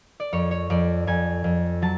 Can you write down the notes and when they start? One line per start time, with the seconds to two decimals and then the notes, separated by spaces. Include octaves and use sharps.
0.20 D5
0.32 F2 C#5
0.51 C#5
0.70 F2 D5
1.07 F2 G#5
1.44 F2
1.82 F#3 A5